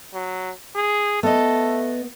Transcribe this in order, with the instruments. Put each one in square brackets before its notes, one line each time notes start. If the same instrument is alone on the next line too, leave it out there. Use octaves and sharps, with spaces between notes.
[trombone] F#3
G#4
[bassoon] A3 [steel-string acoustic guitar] B3 D#5 [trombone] A4